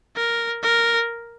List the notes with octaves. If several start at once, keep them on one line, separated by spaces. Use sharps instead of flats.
A#4
A#4